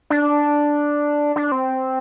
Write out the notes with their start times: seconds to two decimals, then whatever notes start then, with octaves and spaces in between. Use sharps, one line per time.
0.10 D4
1.36 D4
1.52 C4